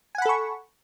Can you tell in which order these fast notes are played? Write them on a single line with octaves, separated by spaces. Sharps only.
G#5 F#5 B5 A4 C#6